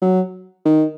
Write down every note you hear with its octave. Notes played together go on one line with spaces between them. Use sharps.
F#3
D#3